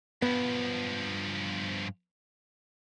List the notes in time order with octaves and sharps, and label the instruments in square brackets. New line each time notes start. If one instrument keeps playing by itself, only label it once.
[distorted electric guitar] G2 F3 [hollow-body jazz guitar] B3